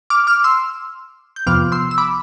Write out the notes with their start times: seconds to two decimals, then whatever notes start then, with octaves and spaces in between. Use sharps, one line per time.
0.10 D6 F6
0.27 D6 F6
0.44 C6 E6
1.36 G6
1.47 F2 C3 F3 B3 D6 F6
1.72 C6 E6
1.91 E6
1.98 B5 D6